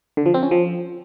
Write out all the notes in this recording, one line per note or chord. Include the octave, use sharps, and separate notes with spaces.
D3
F3
C4
C#4
F3